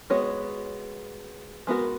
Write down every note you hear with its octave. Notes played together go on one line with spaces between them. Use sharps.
G#3 B3 F#4 C#5
G#3 B3 F#4 A#4